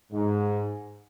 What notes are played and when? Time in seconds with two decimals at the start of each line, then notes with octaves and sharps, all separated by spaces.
0.12 G#2